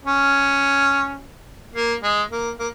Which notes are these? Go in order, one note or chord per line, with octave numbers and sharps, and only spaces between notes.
C#4
A#3
G#3
A#3
A#3